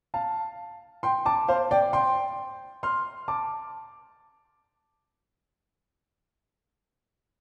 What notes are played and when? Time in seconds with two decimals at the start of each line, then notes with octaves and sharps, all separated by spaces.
0.14 F5 A5
1.03 G5 C6
1.25 A5 D6
1.48 C5 F5
1.71 D5 G5
1.93 G5 C6
2.83 C6 F6
3.28 A5 D6